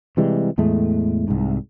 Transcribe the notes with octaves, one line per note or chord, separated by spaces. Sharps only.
C3 E3 G3 G#3
E2 A2 G#3 A3
C2 G#2